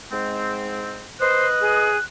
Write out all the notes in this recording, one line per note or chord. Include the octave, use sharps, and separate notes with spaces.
G#2 G#3 C4
B4 C5 D#5 F#6
G#4